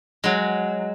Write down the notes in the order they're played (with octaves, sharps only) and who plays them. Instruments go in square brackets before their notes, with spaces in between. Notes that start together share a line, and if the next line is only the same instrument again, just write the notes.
[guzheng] F#3 G#3